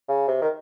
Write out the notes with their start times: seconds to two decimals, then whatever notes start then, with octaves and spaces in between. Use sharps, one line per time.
0.08 C#3
0.28 C3
0.42 D#3